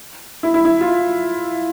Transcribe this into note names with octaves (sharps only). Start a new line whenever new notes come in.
E4
E4
E4
F4